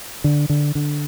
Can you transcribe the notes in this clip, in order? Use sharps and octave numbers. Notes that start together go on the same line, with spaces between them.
D3
D3
D3